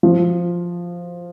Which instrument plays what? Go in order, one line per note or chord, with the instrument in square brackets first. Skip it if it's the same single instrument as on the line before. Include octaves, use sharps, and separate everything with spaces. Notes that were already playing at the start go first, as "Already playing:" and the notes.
[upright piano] F3